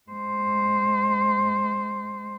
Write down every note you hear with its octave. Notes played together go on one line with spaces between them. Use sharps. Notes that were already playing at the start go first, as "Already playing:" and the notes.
G#3 C5